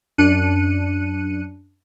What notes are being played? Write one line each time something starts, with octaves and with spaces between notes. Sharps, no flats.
F#2 D4 F#6 C#7 D#7